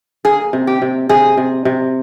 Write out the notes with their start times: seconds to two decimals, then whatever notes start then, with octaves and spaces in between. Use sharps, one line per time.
0.25 A#3 G#4
0.53 C3
0.67 G4
0.82 C3
1.09 C3 G#4
1.37 C3
1.65 C3